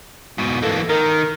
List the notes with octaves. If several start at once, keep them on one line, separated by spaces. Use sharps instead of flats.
G#2 B2
E3 A#3 A4
D#3 A#4